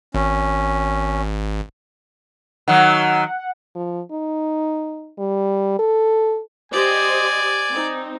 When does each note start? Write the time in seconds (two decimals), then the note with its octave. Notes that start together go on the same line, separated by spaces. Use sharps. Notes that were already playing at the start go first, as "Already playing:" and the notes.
0.15 G#1 C#4
2.68 D#3 F#3 F#5
3.75 F3
4.12 D#4
5.18 G3
5.79 A4
6.72 G4 C5 D5 D#5 G#5
7.71 C4 D#4